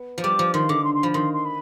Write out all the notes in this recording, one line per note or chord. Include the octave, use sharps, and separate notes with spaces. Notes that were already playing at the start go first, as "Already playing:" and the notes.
Already playing: B3
F3
G3 D6
F3
D#3 C6
D3 D6
C6
C6
F3 B5
D#3 C6
C6
B5